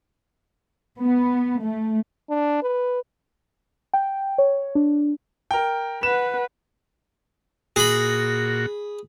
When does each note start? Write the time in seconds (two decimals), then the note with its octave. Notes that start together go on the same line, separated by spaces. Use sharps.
0.99 B3
1.62 A3
2.30 D4
2.62 B4
3.93 G5
4.38 C#5
4.75 D4
5.51 A#4 G5
6.03 B4 F#5 E7
7.76 A#2 F#4 G#4 B5